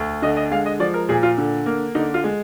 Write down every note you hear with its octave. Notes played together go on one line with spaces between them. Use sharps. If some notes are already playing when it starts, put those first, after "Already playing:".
Already playing: D2
D3 D#5
D#5
G#3 F5
D#5
F3 D5
A#4
A#2 G#4
F4
D3
A#3
D3 D#4
F4
G#3